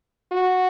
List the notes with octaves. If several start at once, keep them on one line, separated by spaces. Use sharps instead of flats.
F#4